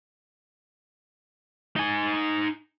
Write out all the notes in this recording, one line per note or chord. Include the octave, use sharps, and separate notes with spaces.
D#4 G#5